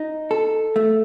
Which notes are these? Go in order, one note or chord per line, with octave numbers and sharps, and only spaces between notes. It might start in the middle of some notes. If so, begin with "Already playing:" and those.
Already playing: D#4
A4
A3